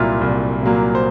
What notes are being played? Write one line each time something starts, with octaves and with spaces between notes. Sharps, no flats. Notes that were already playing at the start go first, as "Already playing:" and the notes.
Already playing: C2 A#2 F#3 A#3 E4 F4
C2
A#2 F#3 A#3
C5